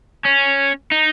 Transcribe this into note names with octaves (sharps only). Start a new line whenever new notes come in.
C#4
D#4